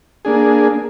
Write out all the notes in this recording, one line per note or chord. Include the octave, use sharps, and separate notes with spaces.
A#3 D4 G#4